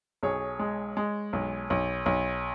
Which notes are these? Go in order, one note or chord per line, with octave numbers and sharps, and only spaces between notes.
B1 G#4 C#5
G#3
G#3
B1
B1
B1